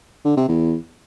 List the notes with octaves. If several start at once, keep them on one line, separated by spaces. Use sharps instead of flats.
D3
C3
E2